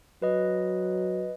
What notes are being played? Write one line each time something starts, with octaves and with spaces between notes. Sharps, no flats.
F#3 B4 D#5